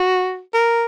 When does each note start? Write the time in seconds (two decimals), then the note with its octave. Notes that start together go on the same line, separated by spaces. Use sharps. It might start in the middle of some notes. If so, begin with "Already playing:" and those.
Already playing: F#4
0.54 A#4